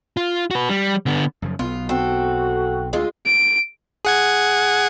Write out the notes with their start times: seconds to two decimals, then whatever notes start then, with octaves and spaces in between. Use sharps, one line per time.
0.17 F4
0.51 F#4 B4
0.69 G3
1.06 D3 B3
1.42 F#2 C#3 F3
1.59 B1 B3 F4
1.89 C4 F#4 A4
2.93 D2 G#3 F4
3.26 D7
4.05 G#4 F#5 G#6